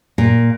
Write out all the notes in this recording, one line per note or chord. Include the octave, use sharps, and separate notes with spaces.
A#2